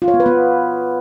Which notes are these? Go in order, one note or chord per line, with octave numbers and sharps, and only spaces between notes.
F4
C#5
B3
B4
B3